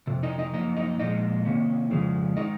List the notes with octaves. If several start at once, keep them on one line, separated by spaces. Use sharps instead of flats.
F2 C3
D#4 D#5
D#4 D#5
F#2 F3 A#3 D#4 D#5
D#4 D#5
A#2 F3 G#3 D#4 D#5
C3 D#3 A#3 C#4
F2 C#3 F3 G#3
D#3 G#3 D#4 D#5